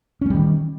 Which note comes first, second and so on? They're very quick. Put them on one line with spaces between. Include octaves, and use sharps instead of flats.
C#4 A3 G3 D#3